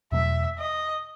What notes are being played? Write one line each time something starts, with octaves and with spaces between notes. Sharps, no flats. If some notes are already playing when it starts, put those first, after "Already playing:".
E2 B2 F#3 A3 E5
D#5